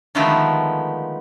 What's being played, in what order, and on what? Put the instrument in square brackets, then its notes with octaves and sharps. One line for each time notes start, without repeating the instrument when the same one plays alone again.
[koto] D3 D#3 F3 G#3 A3 B3